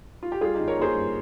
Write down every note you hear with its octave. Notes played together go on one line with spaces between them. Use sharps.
F4
G4
G3 F4 G#4
G1 D#4 G4
A#4 C#5
A#3 G#4 C5
G2